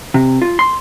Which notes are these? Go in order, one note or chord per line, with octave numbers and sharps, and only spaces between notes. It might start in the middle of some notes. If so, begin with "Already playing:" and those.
C3
F4
C6